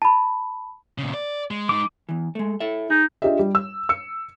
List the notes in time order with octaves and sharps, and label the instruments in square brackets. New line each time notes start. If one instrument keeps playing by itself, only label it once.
[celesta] A5 B5
[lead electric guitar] A#2 C#3
D5
G#3
[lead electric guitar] G#3 D#4 [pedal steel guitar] D6
[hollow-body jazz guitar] E2 E3
G#3 A3
E4 A4 E5
[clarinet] D#4 [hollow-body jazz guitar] G#4
[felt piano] D4 F4 G4 G#4 D#5 E5
G3
E6
E6 C#7